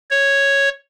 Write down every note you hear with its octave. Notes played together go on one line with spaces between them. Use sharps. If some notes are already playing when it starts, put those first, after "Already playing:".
C#5